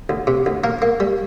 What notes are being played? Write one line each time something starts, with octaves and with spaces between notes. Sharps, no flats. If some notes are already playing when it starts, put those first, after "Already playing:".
D2
C3
D2
A#3 A#4
A#3
G3